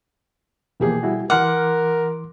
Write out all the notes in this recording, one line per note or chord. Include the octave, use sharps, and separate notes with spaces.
B2 E3 F3 A#3 G4 G#4
G3 E4 F#4
E3 A#4 F#5 C6 D6 F6 F#6